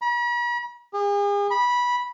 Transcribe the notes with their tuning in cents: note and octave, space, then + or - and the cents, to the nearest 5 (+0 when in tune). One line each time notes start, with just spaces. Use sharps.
B5 -45
G#4 -40
B5 -15